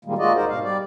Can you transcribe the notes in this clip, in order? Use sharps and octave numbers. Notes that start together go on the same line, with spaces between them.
A#2 D#3 G3 G#3 A#3
G#3 A#3 F4 F#4 D5 D#5
D#2 D#4 A#4 C5
G#2 B2 F5
G3 D5